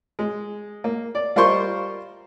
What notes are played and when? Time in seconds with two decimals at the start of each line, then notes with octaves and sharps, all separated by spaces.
0.19 G#3
0.84 A#3
1.15 D5
1.36 G3 F4 A#4 C5 C6 C#6